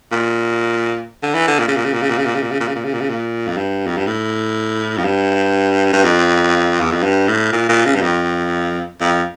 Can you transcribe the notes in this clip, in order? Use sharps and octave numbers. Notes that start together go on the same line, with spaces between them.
A#2
D3
E3
D3
A#2
C#3
A#2
C#3
A#2
C#3
A#2
C#3
A#2
C#3
A#2
C#3
A#2
C#3
A#2
C#3
A#2
C#3
A#2
F2
G2
F2
G2
A2
F2
G2
G2
F2
E2
F2
G2
A2
A#2
A#2
C#3
G2
F2
F2